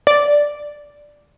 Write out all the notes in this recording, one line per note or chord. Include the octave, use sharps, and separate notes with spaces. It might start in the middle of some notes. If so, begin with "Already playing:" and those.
D5